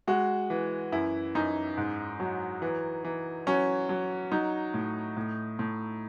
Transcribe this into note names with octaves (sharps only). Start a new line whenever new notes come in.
G#3 F#4
E3
F#2 E4
F#2 D#4
G#2
F#3
E3
E3
F#3 C#4
F#3
F#3 D#4
A2
A2
A2